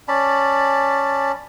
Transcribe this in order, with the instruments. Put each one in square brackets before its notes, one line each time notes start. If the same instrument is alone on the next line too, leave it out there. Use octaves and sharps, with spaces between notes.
[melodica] C#4 D5 A5 B5